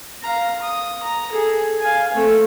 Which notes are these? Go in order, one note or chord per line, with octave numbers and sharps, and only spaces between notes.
F5 A#5
D#6
A#5
G#4 A4
F5 G#5
A3 C4